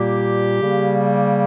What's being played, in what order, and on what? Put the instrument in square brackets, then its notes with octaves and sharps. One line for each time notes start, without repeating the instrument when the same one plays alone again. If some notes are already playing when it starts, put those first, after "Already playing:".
Already playing: [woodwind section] A#2 G3 A#3 G4
C#3 G3 A#3